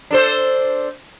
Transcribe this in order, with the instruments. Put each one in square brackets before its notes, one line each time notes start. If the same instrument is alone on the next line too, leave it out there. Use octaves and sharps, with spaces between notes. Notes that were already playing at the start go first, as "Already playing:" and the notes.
[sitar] D4 A4 C5